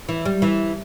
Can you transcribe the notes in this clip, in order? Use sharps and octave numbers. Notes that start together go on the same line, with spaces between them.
E3
G3
E3